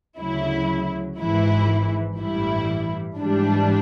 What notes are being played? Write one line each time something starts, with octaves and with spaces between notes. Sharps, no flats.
D2 C#3 F#3 E4
G#1 G#2 E3 E4
A1 G2 E3 G3 E4
G#2 E3 G3 D4